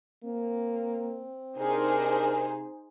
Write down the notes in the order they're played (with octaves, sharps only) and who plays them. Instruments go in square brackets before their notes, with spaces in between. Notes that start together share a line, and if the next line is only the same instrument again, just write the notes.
[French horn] A#3 [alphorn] C4
[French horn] C3 [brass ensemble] D4 A#4 [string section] D#4 G#4 C5